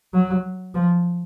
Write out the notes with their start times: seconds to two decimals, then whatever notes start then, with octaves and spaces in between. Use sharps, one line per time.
0.13 F#3
0.74 F3